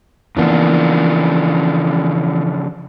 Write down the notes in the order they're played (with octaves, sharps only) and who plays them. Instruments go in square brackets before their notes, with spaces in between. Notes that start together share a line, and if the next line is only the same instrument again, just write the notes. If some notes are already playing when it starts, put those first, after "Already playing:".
[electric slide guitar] C#3 F3 D4 [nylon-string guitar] E3 A#3 B3